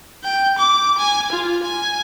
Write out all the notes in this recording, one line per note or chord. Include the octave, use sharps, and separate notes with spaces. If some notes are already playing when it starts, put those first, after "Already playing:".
G5
D6
G#5
F4
G#5